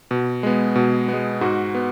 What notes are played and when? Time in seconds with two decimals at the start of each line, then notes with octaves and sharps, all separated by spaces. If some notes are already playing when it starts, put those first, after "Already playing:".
0.11 B2
0.43 G#3 B3
0.76 B2
1.08 G#3 B3
1.41 G#2 F#4
1.75 B3